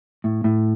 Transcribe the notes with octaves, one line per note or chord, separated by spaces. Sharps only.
A2
A2